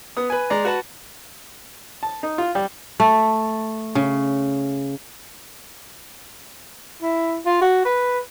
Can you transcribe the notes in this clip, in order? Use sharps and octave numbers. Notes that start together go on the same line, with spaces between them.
B3 D#6
B4 G#5
G#3 D5 A#5
F#4 B4 F#5 A5
A5
D#4
F4
G3
A3
C#3
E4
F4
F#4
B4